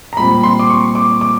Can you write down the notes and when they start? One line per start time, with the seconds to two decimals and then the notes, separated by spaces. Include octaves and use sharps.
0.13 A#5
0.17 A#2 G3 C4 B5
0.43 C6
0.59 D6
0.70 C#6
0.95 D6
1.21 D6